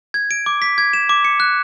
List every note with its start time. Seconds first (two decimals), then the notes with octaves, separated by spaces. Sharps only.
0.14 G#6
0.31 D7
0.46 D6
0.62 B6
0.78 G#6
0.93 E7
1.09 D6
1.25 C#7
1.40 F#6